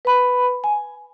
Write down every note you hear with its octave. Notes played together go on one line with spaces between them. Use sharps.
B4 B5
G#5